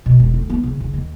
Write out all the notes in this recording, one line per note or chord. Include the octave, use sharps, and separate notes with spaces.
B2
E1
D2
B3
C#3
C#3
D#2